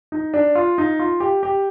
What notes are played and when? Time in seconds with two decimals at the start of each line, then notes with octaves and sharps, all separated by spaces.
0.12 D#4
0.34 D4
0.55 F4
0.78 D#4
0.99 F4
1.20 G4
1.43 G4